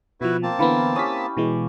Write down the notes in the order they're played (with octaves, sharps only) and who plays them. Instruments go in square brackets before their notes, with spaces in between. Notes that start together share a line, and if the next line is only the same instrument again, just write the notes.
[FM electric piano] B2 F3 [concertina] E4 F#4 B4
[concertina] A#3 C4 A5
[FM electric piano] D3 E3 B3 [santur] E4 F5 B5
[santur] C#4 G4 [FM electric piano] D#6 A6 B6
[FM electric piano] B2 E3 G#3